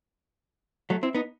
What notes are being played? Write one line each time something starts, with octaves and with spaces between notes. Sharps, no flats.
F#3 A3
C4 E4
B3 D#4